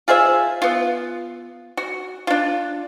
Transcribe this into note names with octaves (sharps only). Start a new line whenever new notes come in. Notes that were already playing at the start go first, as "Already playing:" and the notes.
F4 G#4 C5 E5
B3 F4
F#4
D4 F4